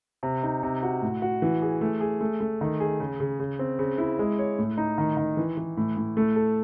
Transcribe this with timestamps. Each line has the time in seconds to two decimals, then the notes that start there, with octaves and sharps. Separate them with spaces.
0.23 C3
0.43 D#4
0.63 C3
0.83 F#4
1.02 A2
1.22 F#4
1.42 E3
1.62 G#4
1.81 A3
2.01 G#4
2.21 A3
2.40 A3
2.61 D#3
2.80 G#4
3.00 C#3
3.20 C#3
3.39 C#3
3.59 C4
3.79 C#3
3.98 E4
4.19 G#3
4.39 C#5
4.58 A2
4.78 D#4
4.98 D#3
5.17 D#3
5.37 E3
5.57 E3
5.77 A2
5.97 A2
6.17 A3
6.36 A4